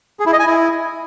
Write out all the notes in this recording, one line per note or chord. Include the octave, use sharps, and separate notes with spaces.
G#4
E4
D#5
G#5
E4